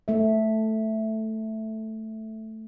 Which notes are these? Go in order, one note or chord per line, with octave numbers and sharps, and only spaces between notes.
A3 E5